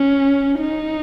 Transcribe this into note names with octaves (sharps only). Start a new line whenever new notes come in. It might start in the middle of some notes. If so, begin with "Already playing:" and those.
Already playing: C#4
D#4